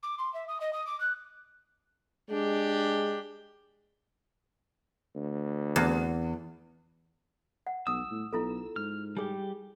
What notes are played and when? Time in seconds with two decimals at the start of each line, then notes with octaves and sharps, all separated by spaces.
0.02 D6
0.18 C6
0.33 E5
0.48 D#6
0.60 D#5
0.73 D#6
0.86 D6
1.00 F#6
2.30 G#3 D4 G4
5.15 D2
5.76 E2
7.67 F#5
7.87 B1 D#6 E6
8.11 A2
8.33 B1 E4 F4 A4
8.76 G#2 F6
9.17 G3 G4 G#4 G#5